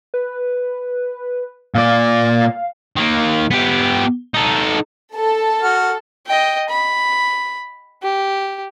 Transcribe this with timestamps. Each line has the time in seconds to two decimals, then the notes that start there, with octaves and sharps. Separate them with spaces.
0.14 B4
1.75 A#2 D5 F5
2.96 D#3 A#3
3.51 B3 G4
4.34 D#4 A4
5.14 A4
5.62 F#4 F6
6.27 D#5 G5
6.69 B5
8.03 G4